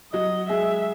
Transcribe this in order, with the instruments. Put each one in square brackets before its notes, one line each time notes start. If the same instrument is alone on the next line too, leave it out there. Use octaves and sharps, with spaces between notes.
[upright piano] F#3 F#4 [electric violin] D#5
[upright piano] G#3 G#4 [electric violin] E5